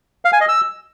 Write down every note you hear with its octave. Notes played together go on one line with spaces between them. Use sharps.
F5
G#5
D#5
E6